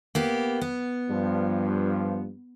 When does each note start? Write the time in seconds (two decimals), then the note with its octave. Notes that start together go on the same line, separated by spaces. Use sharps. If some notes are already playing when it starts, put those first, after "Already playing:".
0.15 A#3 B3 G4
0.61 B3
1.10 G2 F3